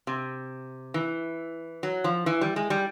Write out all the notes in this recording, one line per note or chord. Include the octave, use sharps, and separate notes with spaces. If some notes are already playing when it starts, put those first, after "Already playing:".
C3
E3
F#3
F3
E3
G3
G#3
G3